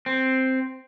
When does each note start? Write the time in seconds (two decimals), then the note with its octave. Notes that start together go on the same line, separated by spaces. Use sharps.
0.06 C4